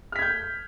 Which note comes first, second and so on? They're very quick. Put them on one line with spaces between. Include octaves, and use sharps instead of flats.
F6 B6 G#6 G6